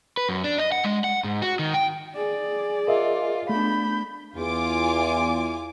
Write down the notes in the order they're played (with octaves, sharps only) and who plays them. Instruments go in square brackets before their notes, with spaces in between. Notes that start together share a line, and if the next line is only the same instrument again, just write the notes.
[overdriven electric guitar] B4
F#2
D4
D#5
F#5
G#3
F#5
G#2
F#4
D#3
G5
[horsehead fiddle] G#4 D5
[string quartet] F4 [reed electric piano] A#4 D#5 E5
[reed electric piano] A3 [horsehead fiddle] B3 D4 [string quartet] B5 G6
[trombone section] E2 [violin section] F4 G#5 D6